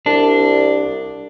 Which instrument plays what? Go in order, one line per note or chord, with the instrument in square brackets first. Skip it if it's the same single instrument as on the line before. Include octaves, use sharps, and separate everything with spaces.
[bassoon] C2 [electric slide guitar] D4